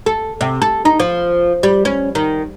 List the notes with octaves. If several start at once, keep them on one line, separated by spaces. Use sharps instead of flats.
A4
C3
A4
D#4
F3
G3
C#4
D#3